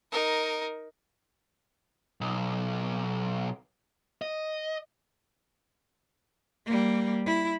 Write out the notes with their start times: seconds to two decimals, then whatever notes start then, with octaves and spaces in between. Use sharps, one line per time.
0.12 D#4 A#4
2.21 B1
4.22 D#5
6.66 G3 A#3
7.26 E4